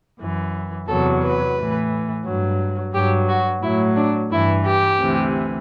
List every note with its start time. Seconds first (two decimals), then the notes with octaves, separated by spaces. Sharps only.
0.20 F#2 E3
0.88 E2 C3 F#3 A4
1.23 B4
1.57 A2 E3
2.25 G2 F#3
2.94 G2 F#3 G4
3.29 F#4
3.63 A2 F#3 E4
3.96 D4
4.31 G2 E3 E4
4.65 G4
5.00 D2 C3 E3